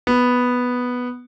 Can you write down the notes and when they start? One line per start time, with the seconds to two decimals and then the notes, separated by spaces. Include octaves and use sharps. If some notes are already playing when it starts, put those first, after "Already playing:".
0.07 B3